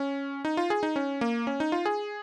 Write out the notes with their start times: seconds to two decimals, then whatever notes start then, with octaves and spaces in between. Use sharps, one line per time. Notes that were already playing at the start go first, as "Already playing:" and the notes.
Already playing: C#4
0.45 D#4
0.57 F4
0.70 G#4
0.83 D#4
0.96 C#4
1.21 A#3
1.47 C#4
1.60 D#4
1.72 F4
1.86 G#4